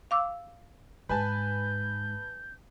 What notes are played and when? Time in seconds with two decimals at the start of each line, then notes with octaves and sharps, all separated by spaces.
0.11 F5 D6 E6
1.09 G#2 B4 G#5 A5 G6